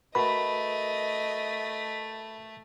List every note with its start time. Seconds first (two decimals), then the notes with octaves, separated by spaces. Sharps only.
0.15 A3 F#4 A#4 B4 D#5 B5